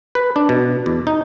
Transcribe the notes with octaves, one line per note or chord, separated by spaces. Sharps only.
B4
D4
B2
E2
D#4